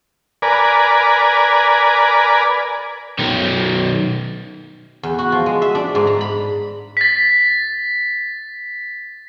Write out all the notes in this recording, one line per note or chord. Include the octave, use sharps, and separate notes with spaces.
A#4 B4 D5 G#5
B1 D#3
E2
F#4
F3
G#3
E5
D4
G#2
A#5
B5
A6 B6